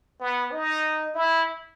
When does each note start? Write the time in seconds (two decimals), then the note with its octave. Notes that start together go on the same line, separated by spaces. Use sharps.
0.20 B3
0.52 D#4
1.14 E4